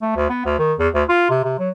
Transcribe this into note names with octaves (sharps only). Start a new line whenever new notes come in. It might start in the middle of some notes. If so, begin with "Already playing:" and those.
A3
D2
B3
D2
D#3
E2
D2
F4
C3
C3
F#3